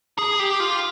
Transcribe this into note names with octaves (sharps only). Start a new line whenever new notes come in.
G#4
G4
F4